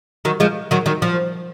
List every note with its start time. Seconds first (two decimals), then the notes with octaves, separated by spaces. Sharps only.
0.25 D#3 F#3
0.40 F3 G#3
0.71 D#3 F#3
0.86 D#3 F#3
1.02 F3